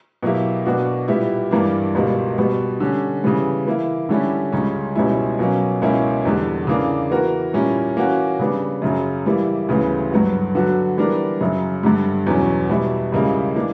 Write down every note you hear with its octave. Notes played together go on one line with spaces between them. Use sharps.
B2 F#3 A#3 E4 G4
B2 A#3 D4 F#4
A#2 G3 B3 E4 G4
G2 E3 G3 A#3 D4
C#2 B2 G3 A#3
B2 G3 B3
D3 G3 C#4
C#3 E3 G3 B3
E3 A#3 E4
D3 G3 C#4 E4 G4
C#2 C#3 G3 C#4
C#2 B2 G3 C#4 E4
B2 F#3 A#3 C#4
C#2 B2 A#3 C#4 E4
E2 D3 G3
C#3 E3 A#3 D4
E3 B3 F#4 A#4
A#2 G3 C#4 E4 A#4
E3 A#3 C#4 F#4
C#3 G3 B3 D4
F#2 C#3 F#3
E3 G3 A#3 E4
D2 C#3 E3 G3 B3
G2 F#3 B3 F#4
D3 F#3 B3 F#4
E3 G3 B3 D4 A#4
F#2 C#3 F#3
G2 D3 G3
E2 B2 F#3 C#4
B2 G3 B3 E4
C#2 C#3 G3 A#3 E4
E3 A#3 D4